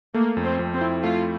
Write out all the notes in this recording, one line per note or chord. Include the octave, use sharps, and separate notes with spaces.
A3 A#3
F2
C4
F2
C4
E4
A3 F4